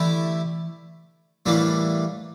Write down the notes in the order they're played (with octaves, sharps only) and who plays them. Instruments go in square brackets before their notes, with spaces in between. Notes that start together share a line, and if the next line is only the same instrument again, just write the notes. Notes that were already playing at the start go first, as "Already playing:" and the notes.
Already playing: [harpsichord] D3 A3 E4 G4 [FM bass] E3
[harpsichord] A2 E3 G3 A#3 D4